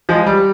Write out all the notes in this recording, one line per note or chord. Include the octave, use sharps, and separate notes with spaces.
F3 G#3
G3